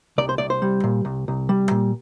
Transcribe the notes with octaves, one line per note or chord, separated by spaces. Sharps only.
C2 D5
C5
C2 D5
C5
G3
A#2
C2
C2
G3
A#2